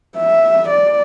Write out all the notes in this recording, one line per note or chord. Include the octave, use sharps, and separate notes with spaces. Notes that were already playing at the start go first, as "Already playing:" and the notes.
E5
D5